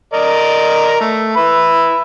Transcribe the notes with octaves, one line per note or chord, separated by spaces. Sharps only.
A#4 D5 D#5
A3
B4 E5 B5